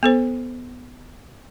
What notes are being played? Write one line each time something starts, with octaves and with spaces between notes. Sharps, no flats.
B3 A4 C5